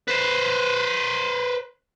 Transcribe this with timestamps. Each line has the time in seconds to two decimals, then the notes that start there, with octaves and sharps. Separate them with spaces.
0.08 B4 C5